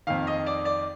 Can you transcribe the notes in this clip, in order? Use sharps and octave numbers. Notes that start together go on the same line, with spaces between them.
F2 D#3 F5
D#5
D5
D5